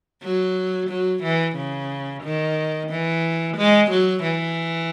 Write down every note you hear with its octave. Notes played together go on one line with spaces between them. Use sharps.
F#3
F#3
E3
C#3
D#3
E3
G#3
F#3
E3